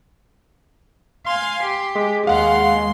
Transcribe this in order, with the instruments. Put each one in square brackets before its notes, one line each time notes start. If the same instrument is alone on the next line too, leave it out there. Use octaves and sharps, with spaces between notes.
[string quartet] F5 G#5 [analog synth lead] C6
[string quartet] G4
[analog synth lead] G#3
[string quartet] D#2 C6 [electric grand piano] F5 F#5